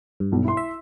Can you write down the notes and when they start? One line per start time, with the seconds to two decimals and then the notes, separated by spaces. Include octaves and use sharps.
0.20 G2
0.32 B1
0.44 E4 C6
0.57 E5